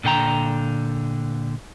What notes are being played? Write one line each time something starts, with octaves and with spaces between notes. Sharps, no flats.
A#2 D3 G5 A#5